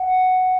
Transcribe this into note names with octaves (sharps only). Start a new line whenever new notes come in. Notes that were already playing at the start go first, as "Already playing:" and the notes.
Already playing: F#5